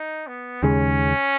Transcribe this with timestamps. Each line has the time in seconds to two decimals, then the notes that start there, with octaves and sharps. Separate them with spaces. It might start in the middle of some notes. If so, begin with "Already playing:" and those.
Already playing: D#4
0.27 B3
0.63 D#2 C#3 G#3 C#4